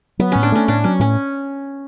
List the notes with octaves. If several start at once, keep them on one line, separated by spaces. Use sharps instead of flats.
F#3 B3
A2 C#4
D4
A3 C#4
A2 D4
F#3 C#4
A2 C#4